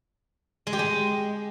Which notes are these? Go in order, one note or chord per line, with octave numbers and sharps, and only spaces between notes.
G#3
G4
G#3